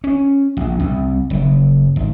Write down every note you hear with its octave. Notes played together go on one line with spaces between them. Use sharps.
C#4
A#1
C2
F#1
G#1